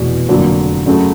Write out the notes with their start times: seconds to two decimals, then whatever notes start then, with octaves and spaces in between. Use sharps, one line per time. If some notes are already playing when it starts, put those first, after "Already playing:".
Already playing: F1 E2 B2
0.29 F1 F2 D3 F#3 A#3
0.86 C#3 F#3 A3